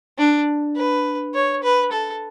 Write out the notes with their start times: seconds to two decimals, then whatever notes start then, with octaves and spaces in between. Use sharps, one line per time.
0.18 D4
0.76 B4
1.34 C#5
1.63 B4
1.92 A4